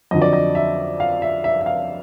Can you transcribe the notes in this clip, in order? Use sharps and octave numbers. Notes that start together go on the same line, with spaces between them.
F2 D3 F#3 D#5
D5
D#5
E5
F5
E5
E5
E5
F5